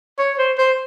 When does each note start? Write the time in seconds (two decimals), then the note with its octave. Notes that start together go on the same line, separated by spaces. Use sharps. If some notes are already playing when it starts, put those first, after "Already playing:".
0.18 C#5
0.38 C5
0.58 C5